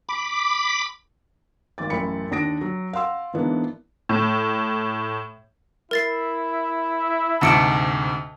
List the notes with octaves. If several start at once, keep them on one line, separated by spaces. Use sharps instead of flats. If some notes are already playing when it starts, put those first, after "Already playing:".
B5 D6
G#1 D6 A6
A1 F#2 B5 C#7
D#2 D4 D#6 A#6 D7
F#3
F5 F#5 C6 E6 F6
G#2 E3 A#3 B3 D4
A2
E4 A#4 A6 C7
D2 G#2 C3 A5 C#7 D7